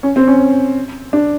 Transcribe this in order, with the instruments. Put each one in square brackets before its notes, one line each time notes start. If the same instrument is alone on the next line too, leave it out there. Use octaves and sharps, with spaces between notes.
[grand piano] C#4
C4
C#4
D4